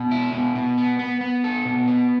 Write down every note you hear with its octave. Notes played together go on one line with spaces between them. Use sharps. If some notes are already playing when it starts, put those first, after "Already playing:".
Already playing: B2
E4
B2
B2
B3
B3
B3
A4
B2
B3